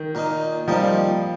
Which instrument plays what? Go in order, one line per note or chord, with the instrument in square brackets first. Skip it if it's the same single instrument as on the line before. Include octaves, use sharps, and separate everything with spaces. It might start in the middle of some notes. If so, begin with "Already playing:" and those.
Already playing: [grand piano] D#3
[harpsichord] A#2 A#3 D#4
[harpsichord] A#2 G3 C4 D#4 [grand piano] F3